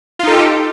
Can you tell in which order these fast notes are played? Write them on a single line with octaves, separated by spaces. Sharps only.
F4 D#4 A4 G4